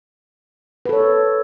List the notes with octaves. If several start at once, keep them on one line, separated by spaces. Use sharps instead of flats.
A4 B4 C#5